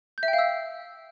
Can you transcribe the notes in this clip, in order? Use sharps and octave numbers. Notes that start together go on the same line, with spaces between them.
G6
E5
G5
F5
E6